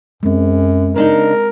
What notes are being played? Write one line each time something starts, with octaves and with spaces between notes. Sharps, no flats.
F#2 G#3 C4
C#3 D4 D#4 A#4